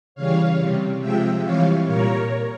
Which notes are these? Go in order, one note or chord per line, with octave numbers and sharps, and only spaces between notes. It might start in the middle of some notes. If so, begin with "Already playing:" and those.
C#3 E3 G3 C#5 F5
C3 G3
C3 F3 G#3 E5 G5
C3 E3 G3 C#5 F5
A#2 G3 A#4 C#5